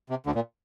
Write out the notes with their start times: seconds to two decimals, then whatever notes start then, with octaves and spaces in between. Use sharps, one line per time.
0.10 C3
0.26 D2 D3
0.35 A#2